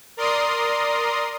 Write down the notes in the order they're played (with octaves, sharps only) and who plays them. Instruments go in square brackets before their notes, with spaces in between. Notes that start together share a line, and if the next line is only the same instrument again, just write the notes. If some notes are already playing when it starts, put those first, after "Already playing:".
[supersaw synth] A#4 D5 A#5 C6 D#6